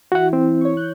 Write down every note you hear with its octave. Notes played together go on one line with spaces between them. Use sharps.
E3 E4 F#4 F#5
C4
C#5 C#6
F#6 G6